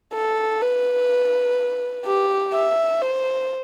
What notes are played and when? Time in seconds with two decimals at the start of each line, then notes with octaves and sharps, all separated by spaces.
0.13 A4
0.62 B4
2.06 G4
2.54 E5
3.01 C5